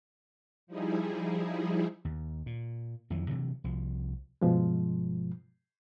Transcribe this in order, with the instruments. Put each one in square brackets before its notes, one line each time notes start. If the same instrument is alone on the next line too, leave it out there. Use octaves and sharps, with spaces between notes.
[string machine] F3 G3 D#4 E4 G#4
[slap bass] D#2
A#2
F2 D#3 E3 F#3
C3 E3 F#3
C2 F3
[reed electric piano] G2 B2 F3 G#3